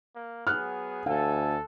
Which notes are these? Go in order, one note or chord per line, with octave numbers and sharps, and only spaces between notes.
A#3
F#3 B3 G#4 F6 F#6
D2 A4 F5 G#5